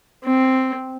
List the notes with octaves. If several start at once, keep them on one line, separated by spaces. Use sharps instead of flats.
C4